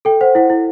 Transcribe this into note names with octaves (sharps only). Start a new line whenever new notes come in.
A4 G5
C5 F#5
E4 F#5
E4